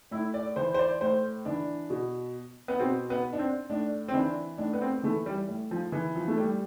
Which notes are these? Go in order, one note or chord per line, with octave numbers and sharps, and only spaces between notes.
A2 E4
D5
E3 C5
C5
D5
A2 C5
E3 D4
B2
B3
B2 C4
B3
D4
C4
A2 D4
C4
E3 D4
A2 D4
B3
C4
E3 A3
G3
A2
F3
E3
F3
A3
A2 G3